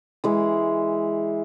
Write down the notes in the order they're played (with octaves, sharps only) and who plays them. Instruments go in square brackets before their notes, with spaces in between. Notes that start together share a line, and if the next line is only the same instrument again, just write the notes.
[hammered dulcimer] E3 G#3